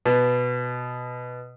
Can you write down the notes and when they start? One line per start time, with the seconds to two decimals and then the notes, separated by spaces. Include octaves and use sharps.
0.06 B2